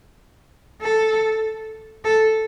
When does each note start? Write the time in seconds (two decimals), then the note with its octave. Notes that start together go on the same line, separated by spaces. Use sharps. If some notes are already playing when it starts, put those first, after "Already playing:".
0.82 A4
2.05 A4